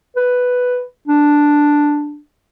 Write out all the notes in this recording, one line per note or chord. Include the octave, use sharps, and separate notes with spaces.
B4
D4